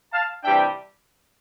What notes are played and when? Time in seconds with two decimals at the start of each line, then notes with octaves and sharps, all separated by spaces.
0.13 F5 A5
0.43 C3 E3 G3 D4 E5 G5